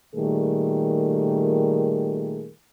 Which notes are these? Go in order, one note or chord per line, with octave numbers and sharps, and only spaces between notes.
A#2 D#3 G3 A3 G#4 A#4